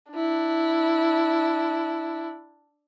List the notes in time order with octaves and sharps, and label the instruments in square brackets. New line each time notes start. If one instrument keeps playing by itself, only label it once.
[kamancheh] D4 E4